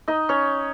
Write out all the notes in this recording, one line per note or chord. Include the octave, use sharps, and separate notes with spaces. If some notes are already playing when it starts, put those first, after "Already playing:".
D#4 D#5
C#4 C#5